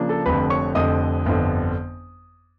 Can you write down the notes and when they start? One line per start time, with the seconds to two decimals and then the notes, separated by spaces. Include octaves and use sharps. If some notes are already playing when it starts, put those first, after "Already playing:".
Already playing: C#3 F3 A#3 D4
0.09 A4 A5
0.26 F1 F2 D3 B4 B5
0.50 C#5 C#6
0.75 F1 F2 D3 D#5 D#6
1.26 G1 F2 D3